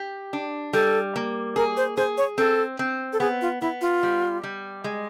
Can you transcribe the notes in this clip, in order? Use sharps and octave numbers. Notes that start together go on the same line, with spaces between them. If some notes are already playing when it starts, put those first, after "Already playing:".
Already playing: G4
D4
G3 A4
A#3
G#4 A#4
C5
G#4 C5
C#5
C4 A4
C4
A4
B3 G#4
F4
B3 E4
F4
G3
G3
G#3